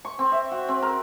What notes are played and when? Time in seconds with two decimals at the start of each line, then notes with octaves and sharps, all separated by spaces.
0.05 C#6
0.19 C4
0.32 E5
0.51 F#4
0.68 C4
0.82 A#4